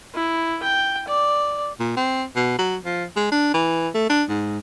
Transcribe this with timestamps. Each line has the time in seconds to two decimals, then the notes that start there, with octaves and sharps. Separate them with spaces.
0.15 E4
0.63 G5
1.07 D5
1.80 A#2
1.97 C4
2.36 B2
2.59 F#3
2.85 F3
3.16 G#3
3.32 D4
3.54 E3
3.94 A3
4.10 D4
4.29 G#2